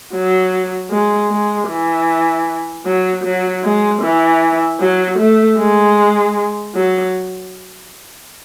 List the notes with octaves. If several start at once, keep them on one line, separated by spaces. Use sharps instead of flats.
F#3
G#3
G#3
E3
F#3
F#3
G#3
E3
F#3
A3
G#3
F#3